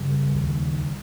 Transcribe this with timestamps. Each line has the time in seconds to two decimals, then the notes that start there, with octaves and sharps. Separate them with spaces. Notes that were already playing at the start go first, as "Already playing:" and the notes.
Already playing: F#2 C#3 G3
0.34 D#2